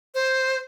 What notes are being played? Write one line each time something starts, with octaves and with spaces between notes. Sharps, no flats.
C5